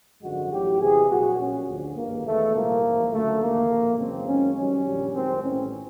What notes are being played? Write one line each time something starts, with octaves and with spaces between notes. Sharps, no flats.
G#1 F#2 D3 F3 G#3 F#4
A1 A2 F#3 G4
E2 C3 E3 G#3 G#4
A#1 A#2 F#3 F#4
A#1 A#2 F#3 C#4
D2 D3 F3
G#1 G2 D#3 G#3 A#3
E2 B2 G#3 A3
C2 A#2 F3 A#3
A1 G#2 F3
D2 C#3 F#3 A3
D#2 D3 F3 A#3
A#1 A2 F3
F#2 C#3 E3 G#3 C4
F#2 D#3 G#3 C#4
F#2 D#3 G3 C#4
A#1 A#2 G3
F#2 D#3 G#3 C4
A1 A2 E3 G3 C#4